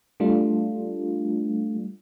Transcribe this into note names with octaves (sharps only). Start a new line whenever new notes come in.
G3 A3 D4 F4